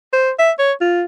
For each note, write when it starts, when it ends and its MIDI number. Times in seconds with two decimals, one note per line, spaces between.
0.13 0.31 72
0.39 0.52 76
0.59 0.73 73
0.81 1.04 65